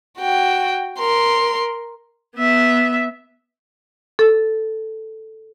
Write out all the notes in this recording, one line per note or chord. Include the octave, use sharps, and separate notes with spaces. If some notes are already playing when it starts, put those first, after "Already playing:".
F#4 G5
A#4 C6
B3 E5
A4